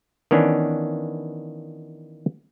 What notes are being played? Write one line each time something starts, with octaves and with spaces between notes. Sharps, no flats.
D#3 E3 B3 C#4 D4